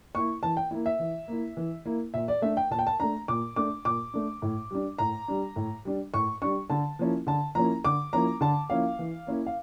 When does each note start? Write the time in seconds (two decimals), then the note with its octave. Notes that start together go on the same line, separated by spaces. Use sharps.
0.14 A#3 E4 C#6
0.43 E3 A5
0.57 G5
0.71 A#3 E4
0.86 E5
0.99 E3
1.28 A#3 E4
1.57 E3
1.86 A#3 E4
2.14 A#2 E5
2.28 D5
2.42 A3 D4 E5
2.57 G5
2.70 A#2 A5
2.79 G5
2.87 A5
3.00 A3 D4 A#5
3.28 A#2 D6
3.56 A3 D4 D6
3.85 A#2 D6
4.14 A3 D4
4.42 A2
4.71 G3 D4
4.99 A2 A#5
5.28 G3 D4
5.56 A2
5.85 G3 D4
6.14 A2 C#6
6.42 G3 D4 C#6
6.70 D3 A5
6.99 F3 A#3 C#4 E4
7.27 D3 A5
7.55 F3 A#3 C#4 E4 A#5
7.85 D3 D6
8.13 F3 A#3 C#4 E4 A#5
8.41 D3 A5
8.70 F3 A#3 C#4 E4 F5
8.99 E3
9.27 A#3 C#4 E4
9.46 F5